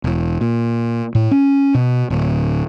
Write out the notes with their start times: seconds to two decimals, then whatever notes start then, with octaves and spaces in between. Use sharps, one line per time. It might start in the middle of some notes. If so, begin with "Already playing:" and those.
0.04 E1
0.41 A#2
1.15 A2
1.31 C#4
1.74 B2
2.10 D1